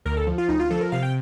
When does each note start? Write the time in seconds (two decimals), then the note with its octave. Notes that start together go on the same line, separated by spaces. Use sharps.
0.05 D2 A#4
0.17 A4
0.27 F3
0.38 F4
0.49 D2 D#4
0.60 F4
0.70 F3 A4
0.81 A#4
0.92 C3 F5
1.03 G5